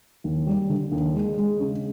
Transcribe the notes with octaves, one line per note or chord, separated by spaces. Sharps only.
D#2
G3
D3
D#2
G#3
G#3
C#3